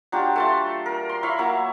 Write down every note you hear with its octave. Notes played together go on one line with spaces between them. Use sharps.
F#3 D4 F4 G4
A3 A5 C6
A#4
C6
E4 C#5 F5 B5
F#3 A#3 E4